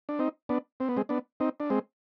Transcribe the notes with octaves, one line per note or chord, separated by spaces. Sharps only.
D4
C4 D#4
B3 D4
C4
B3
G#3 C4
B3 D4
C4 D#4
D4
G#3 C4